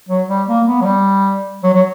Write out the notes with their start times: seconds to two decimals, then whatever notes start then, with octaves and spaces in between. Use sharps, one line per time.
0.09 F#3
0.28 G3
0.47 A#3
0.67 B3
0.81 F#3
0.85 G3
1.63 F#3
1.74 F#3